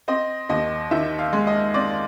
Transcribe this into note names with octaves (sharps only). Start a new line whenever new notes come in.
C4 D#5
D#2 D#5
D#3 E5
F5
G#3
D#5
C4 D5